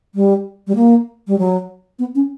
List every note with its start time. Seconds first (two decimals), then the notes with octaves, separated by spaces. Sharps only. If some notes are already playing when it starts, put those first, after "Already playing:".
0.15 G3
0.67 G3
0.76 A#3
1.28 G3
1.38 F#3
1.99 B3
2.15 C#4